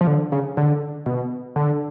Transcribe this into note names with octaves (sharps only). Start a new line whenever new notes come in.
F3
D3
C#3
D3
B2
D3